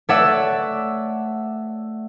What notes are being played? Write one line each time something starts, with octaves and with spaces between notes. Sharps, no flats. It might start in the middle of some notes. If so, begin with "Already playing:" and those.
A3 C#5 D5 E5 F#5